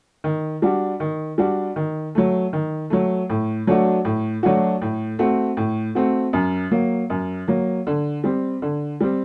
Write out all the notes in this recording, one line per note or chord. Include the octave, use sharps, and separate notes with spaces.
D#3
G3 D4 F#4
D#3
G3 D4 F#4
D#3
F#3 A3
D#3
F#3 A3
A2
F#3 A3 D4 F#4
A2
F#3 A3 D4 F#4
A2
A3 C4 F#4
A2
A3 C4 F#4
F#2
F#3 A#3
F#2
F#3 A#3
D3
G3 C4
D3
G3 C4